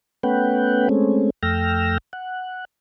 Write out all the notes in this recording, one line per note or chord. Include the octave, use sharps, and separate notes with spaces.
A3 B3 C#4 B4 F#5 G5
G#3 A3 C4 C#4
F2 A3 G5 E6 F6 A#6
F#5